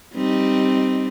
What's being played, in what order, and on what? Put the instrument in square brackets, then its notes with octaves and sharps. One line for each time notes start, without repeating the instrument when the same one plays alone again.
[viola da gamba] G3 C4 D#4